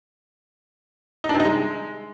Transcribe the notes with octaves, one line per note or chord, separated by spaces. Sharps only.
D#4
D4
C3
D#4
G#3